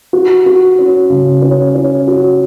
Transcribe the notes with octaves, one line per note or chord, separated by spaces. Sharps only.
F#4
F#4
C#4
C#3
C#4
C#4
F#4